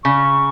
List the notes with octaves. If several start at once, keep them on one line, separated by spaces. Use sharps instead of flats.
C#3 C#6